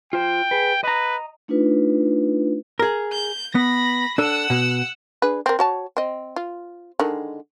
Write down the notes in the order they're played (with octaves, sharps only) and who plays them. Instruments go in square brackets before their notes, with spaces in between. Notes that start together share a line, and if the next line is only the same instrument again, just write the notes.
[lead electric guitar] F4 C5 [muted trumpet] G5
[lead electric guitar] G#4 B4
[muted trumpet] B4 [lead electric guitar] D#5 A#5
[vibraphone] A3 D4 D#4 F4 B4
[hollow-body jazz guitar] G#4 A#4
[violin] G6
[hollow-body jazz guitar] B3 [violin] B5 A#6
[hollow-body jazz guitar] D4 A4 [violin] F#5 E6
[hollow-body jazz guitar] B2
[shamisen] D4 G#4 B4
C4 A#4
F#4 C#5 A5
C4 D#5
F4
D3 D#3 G#3